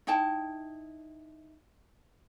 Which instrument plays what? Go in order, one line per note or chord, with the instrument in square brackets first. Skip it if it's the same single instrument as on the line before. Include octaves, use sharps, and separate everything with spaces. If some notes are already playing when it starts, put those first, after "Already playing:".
[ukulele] D#4 E4 G5 A5